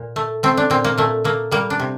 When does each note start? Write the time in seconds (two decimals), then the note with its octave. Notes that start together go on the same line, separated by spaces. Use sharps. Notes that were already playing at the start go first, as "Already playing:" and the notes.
Already playing: A#2
0.16 A3
0.43 A3 C4
0.57 D4
0.70 A#2 C4
0.84 A#3
0.98 A#2 A3
1.24 A3 A#3
1.51 G3 A#3
1.70 D4
1.79 C3